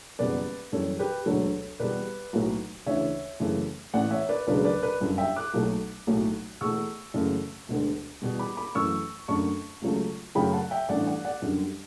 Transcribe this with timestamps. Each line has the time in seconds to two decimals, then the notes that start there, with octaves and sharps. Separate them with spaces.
0.19 F#1 E2 B2 G3 B4 D5
0.72 F#2 E3 G3 A4 C#5
0.99 G4 B4
1.26 E1 D2 D3 F#3 A4 C#5
1.80 E2 B2 G3 B4 D5
2.33 B1 A2 F#3
2.86 D2 C#3 E3 C#5 E5
3.40 F#2 C#3 E3 A3
3.93 A1 A2 E3 D5 F#5
4.11 C#5 E5
4.29 B4 D5
4.47 E1 D2 C#3 F#3 A3 B4 D5
4.65 B4 D5
4.83 B4 D5
5.00 G1 F#2 D3 G3
5.18 E5 G5
5.36 D6 F#6
5.54 B1 B2 F#3 A3
6.07 B1 A2 F#3 A3
6.61 E2 B2 A3 C#6 E6
7.14 F#2 C#3 E3 A3
7.68 E1 D2 D3
8.22 E2 B2 G3
8.39 B5 D6
8.57 B5 D6
8.75 F#2 E3 A3 C#6 E6
9.28 F#2 D3 A3 A5 C#6
9.82 C#2 C#3 F#3 A3
10.35 F#2 C#3 F#3 A3 G5 B5
10.53 F#5 A5
10.71 E5 G5
10.89 A1 G2 E3 A3 D5 F#5
11.07 D5 F#5
11.25 D5 F#5
11.42 F#2 D3 G3